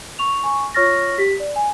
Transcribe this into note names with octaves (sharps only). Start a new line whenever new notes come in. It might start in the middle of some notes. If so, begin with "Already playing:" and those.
C#6 F7
G#5 C#6
F4 C#5 C#6 F6 A6 A#6
G4 B6
D5
G#5